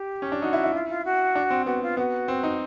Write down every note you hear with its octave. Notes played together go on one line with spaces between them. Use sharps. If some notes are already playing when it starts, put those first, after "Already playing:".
Already playing: G4
C#4
D4
D#4 F#4
E4
E4
F4
F4
F#4
D4
C4
B3 F#4
F4
B3 F#4
C4
D#4